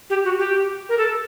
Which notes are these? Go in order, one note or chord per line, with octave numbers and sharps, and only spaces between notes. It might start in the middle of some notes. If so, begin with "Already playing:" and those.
G4
F#4
G4
A#4
A4